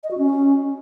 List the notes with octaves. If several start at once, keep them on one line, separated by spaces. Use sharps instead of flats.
D#5
F#4
C#4